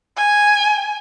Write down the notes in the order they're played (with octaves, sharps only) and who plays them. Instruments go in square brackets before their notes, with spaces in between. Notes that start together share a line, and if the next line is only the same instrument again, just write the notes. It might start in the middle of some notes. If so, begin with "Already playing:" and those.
[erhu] G#5